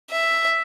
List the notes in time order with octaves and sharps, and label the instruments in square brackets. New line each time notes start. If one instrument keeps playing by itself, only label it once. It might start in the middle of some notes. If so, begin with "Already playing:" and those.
[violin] E5